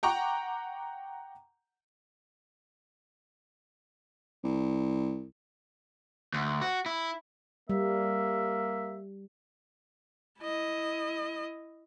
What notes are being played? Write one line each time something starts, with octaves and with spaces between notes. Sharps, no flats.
F#5 G5 A#5 C#6 D6
C2
D2
F#4
E4
G3 A#3 E5
E4 D#5